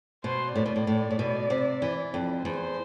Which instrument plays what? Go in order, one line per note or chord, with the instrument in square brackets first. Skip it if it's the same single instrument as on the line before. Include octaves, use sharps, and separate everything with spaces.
[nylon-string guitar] B2 [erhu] C5
[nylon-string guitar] A2 [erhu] D5
[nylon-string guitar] B2
A2
A2
A2
B2
C3
E3
F2
[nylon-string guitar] E2 [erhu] C5